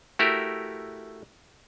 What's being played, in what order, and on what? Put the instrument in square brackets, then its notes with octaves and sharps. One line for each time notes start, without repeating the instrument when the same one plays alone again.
[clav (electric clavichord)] A3 E4 F#4 G4 A#4